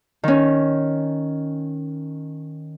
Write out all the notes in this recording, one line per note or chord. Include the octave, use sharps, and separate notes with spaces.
D#3 C#4